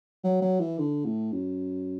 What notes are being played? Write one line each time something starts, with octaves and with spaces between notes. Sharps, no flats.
F#3
F#3
E3
D3
A2
F#2